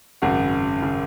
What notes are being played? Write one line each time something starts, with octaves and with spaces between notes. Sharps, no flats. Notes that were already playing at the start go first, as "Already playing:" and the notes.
G#1 F#2 C#3 F#4
C#3